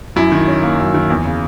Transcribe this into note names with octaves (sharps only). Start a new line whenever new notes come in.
F#2 E4
D#3
C#4
A#3
F#2
D#3
E2
C#3